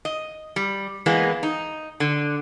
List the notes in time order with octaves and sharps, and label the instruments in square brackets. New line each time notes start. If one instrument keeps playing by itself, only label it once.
[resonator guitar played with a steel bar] D#5
G3
E3 G#3 A#3 B3
D#4
D3